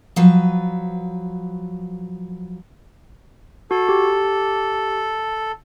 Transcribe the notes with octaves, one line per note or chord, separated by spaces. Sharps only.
F3 F#3 B4
F#4 A4
G4